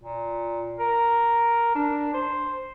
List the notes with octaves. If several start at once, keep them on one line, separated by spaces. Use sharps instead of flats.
A#2
A#4
D4
C5